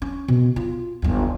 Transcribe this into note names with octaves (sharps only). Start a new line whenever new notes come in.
C#4
B2
F4
G1 D#2